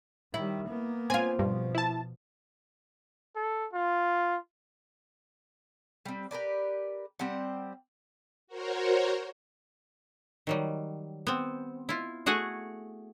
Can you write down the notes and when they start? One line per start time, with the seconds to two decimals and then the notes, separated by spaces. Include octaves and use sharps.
0.34 D#3 G3 E4
0.68 A#3 B3
1.10 C4 F4 G#5
1.39 G2 B2 F3
1.75 E4 A5
3.36 A4
3.73 F4
6.06 G3 C4
6.31 G4 A#4 B4 D5
7.19 G3 C4 G4 F#5
8.47 F#4 A#4 C5 C#5
10.47 D#3 F#3 G3
11.27 B3 C4
11.89 E4 F4
12.26 A3 F#4 G#4 F#5 G#5